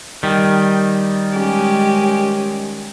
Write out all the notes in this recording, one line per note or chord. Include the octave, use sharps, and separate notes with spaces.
D#3 G3
G#3 C#4 G4